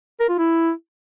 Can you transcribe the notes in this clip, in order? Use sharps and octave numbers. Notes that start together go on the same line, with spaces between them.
A#4
F4
E4